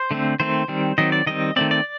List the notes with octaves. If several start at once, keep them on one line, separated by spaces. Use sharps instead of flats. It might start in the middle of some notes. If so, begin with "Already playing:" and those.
Already playing: C5
D3 A3 C4
D#3 A3 C4 C5
D#3 G3 C4
D#3 F#3 C4 D#5
D5
D#3 G3 C4 D#5
D#3 A3 C4 D5
D5